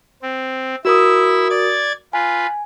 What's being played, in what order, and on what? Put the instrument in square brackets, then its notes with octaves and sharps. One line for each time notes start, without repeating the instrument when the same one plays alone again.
[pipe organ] C4
[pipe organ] E4 E6 [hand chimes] F#4 A#4 D#6
[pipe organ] D5 G#6 A6
[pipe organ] F4 B4 [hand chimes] G#5